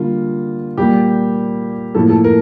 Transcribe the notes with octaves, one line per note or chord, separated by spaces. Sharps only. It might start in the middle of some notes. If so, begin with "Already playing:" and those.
Already playing: D3 G3 A#3 F4
A#2 G3 A#3 G4
A2 F3 A#3 A4
A4
A#4